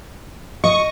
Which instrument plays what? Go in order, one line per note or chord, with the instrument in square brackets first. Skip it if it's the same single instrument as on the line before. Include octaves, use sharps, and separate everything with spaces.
[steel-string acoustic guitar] D#5 [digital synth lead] C#6